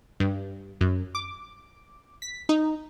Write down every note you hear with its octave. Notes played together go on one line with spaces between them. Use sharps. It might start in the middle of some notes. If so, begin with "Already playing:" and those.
G2
F#2
D6
B6
D#4